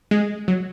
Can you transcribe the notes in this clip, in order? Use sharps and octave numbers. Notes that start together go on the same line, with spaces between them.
G#3
F#3